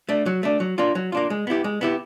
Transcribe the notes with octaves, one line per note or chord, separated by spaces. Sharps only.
A3 D4
F#3
A3 D4
F#3
A#3 D4 F4
F#3
A#3 D4 F4
G#3
B3 E4 G4
G#3
B3 E4 G4